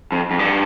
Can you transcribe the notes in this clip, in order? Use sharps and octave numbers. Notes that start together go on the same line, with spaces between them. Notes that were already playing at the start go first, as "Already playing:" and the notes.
F2
F2
G2